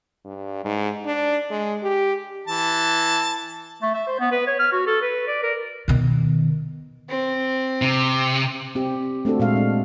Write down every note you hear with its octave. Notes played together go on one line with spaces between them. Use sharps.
G2
G#2
D4
G#3
G4
E3 A5
A3
E5
C5
B3
B4
C#5
F6
F#4
A4
B4
D5
A#4
B2 D#3
C4
C3
C4 G4
A3 C4 D4 F#4 A4
A#2 G#3 A4 F5
C4 D4